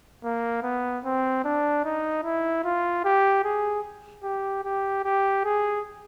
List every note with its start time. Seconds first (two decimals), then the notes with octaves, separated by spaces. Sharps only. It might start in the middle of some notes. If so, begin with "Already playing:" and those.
0.24 A#3
0.63 B3
1.04 C4
1.44 D4
1.84 D#4
2.24 E4
2.64 F4
3.05 G4
3.44 G#4
4.24 G4
4.64 G4
5.04 G4
5.45 G#4